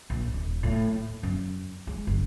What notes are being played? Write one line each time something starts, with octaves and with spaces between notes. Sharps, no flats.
A#1
D#1
A2
A#3
F#2
G#3
F#1